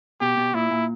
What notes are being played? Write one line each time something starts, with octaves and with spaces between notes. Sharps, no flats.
B2 G4
B2
A#2 E4
A#2